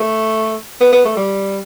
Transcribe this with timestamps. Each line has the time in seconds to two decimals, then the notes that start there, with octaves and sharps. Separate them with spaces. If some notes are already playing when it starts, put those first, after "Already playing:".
Already playing: A3
0.81 B3
0.92 B3
1.05 A3
1.17 G3